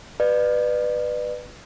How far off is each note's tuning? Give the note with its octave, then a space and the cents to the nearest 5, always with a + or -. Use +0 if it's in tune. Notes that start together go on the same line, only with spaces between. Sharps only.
B4 +0 D5 +35